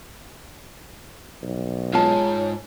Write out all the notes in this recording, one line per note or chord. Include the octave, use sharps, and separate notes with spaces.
B1
G#2 F4 C#5 A5